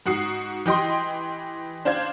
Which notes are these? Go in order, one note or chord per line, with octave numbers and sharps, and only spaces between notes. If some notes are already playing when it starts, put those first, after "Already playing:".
G#2 F#4 D#6 C7
E3 G4 D#5 G5 C6
D4 C5 F5 G#6